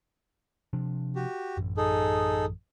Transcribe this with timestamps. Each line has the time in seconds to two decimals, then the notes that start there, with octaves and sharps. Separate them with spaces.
0.73 C3 F3 D4
1.16 F#4 G4
1.57 A1 F#2
1.77 D#4 G#4 A4